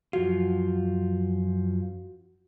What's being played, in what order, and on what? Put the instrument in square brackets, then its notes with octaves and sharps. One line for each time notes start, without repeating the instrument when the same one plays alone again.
[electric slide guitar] F#2 F3 F4 [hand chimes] F#4